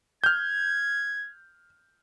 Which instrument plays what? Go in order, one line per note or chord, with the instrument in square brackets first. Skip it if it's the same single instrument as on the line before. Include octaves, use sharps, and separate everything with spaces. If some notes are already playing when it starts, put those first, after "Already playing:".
[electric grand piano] F6 G6 [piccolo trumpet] G#6